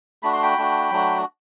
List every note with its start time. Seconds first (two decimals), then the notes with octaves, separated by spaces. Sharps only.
0.23 A3 D4 F#4 B5
0.33 C6
0.43 G5 B5
0.58 A3 D4 F#4
0.91 F#3 A3 D4 F#4